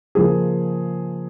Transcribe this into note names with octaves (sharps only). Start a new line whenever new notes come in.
C#3 F3 A#3 G#4